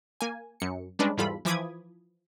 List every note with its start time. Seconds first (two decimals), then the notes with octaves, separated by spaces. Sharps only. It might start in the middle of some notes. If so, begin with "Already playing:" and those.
0.21 A#3 G#5
0.60 F#2 C#7
0.99 G3 G#3 C#4 D4 B4
1.17 E2 G#2 G3 F4 A4 B5
1.45 E3 F3 B5 D6 D#6 G#6